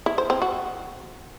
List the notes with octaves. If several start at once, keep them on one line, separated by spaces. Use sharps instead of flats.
E4
C5
C4
F#4